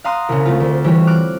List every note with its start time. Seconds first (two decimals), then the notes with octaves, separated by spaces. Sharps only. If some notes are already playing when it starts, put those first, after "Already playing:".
0.04 F5 F#5 A#5 C6 D#6 F#6
0.29 C2 C#3
0.45 A3 C4 F4
0.60 D2
0.84 E3 G3 C4 F#4 G4 C#5
1.07 D6 F6 F#6